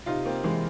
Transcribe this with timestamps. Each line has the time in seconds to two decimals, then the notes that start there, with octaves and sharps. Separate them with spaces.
0.06 C3 D#4 F4
0.25 A#3 C4
0.44 E3 G#3 A#3